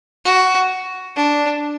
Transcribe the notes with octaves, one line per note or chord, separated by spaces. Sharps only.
F#4
D4